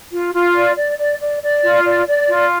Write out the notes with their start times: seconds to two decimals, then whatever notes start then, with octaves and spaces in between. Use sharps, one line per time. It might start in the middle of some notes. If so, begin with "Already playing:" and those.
0.11 F4
0.34 F4
0.55 D5
0.76 D5
0.98 D5
1.20 D5
1.42 D5
1.63 F4
1.85 D5
2.07 D5
2.28 F4